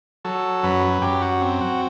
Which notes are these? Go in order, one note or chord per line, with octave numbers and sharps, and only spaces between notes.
F#3 A4
F#2 B4
F#2 G4
F#4
C4
F#4